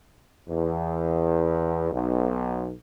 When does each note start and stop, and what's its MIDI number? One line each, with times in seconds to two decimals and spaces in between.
0.49 1.90 40
1.92 2.72 35